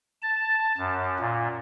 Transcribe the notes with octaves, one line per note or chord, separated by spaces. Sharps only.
A5
F#2
A#2